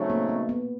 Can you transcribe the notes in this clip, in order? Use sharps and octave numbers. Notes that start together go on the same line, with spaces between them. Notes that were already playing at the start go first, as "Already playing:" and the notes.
Already playing: C#3 F#3 A3 C4 D#4
A#3
B3
B3